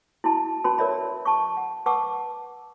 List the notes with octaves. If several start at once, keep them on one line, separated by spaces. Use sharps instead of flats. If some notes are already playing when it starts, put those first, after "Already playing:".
E4 F#4 A5
C#4 F#4 B4 A5 B5 C6
A#4 B4 C#5 D5 E5 B5
A5 C#6
F#5
B4 F#5 A5 C#6 D6 E6